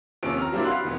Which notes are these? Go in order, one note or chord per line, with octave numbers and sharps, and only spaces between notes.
D#2 C3 F3 C#4 D7
A#5 F6
F#3 G3 A#3 C4 D4 E4
F5 F#5 B5 C6 F#6
E1 B3